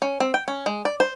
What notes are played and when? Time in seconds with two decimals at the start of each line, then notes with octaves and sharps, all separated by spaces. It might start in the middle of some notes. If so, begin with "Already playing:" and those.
0.02 C#4
0.20 C4
0.34 G5
0.48 C#4
0.66 G#3
0.85 D5
1.00 C5